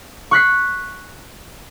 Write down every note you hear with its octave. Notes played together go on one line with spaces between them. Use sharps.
C#6 F#6 B6 C7